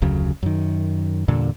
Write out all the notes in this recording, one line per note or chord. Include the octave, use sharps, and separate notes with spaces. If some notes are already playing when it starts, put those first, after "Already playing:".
F1 D2 C#3 F#3
F#2 D#3
E2 G2 A#2 D3